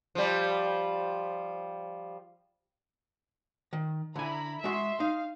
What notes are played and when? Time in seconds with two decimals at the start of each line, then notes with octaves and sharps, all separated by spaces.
0.15 F3 G3
3.73 D#3
4.16 D3 E4 G#5 A#5 B5
4.64 G#3 F#4 E5 C6
5.00 D#4 F5